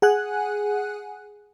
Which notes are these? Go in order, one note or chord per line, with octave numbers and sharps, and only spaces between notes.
G#4 F#5 G#5 F#6